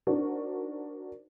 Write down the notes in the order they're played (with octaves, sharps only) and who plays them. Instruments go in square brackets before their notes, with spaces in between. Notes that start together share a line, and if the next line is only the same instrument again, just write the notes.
[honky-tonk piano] D4 D#4 F#4 A#4 C5